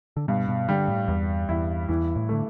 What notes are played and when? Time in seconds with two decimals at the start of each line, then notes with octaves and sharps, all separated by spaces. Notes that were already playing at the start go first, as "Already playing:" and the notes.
0.17 D3
0.28 G2 B2
0.49 B2
0.69 D3 G3
0.88 A2
1.08 E2 G2
1.49 E2 E4
1.89 E2 E3
2.16 A2
2.29 D3 A3